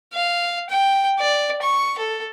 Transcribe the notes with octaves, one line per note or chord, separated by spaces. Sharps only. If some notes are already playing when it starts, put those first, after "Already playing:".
F5
G5
D5
C#6
A4